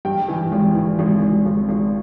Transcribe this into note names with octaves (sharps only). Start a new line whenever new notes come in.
G2 G5
E3
G#1
E3
G#1
G#1
G#1
G#1